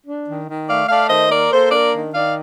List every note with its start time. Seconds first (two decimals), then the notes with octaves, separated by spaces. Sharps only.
0.05 D4
0.27 D#3
0.47 D#3
0.68 A3 D5 F5
0.89 A3 D5 F5
1.09 D#3 C5 D#5
1.30 A#3 A#4 D5
1.51 A#3 A4 C5
1.71 D4 A#4 D5
1.92 D#3
2.14 D#3 D5 F5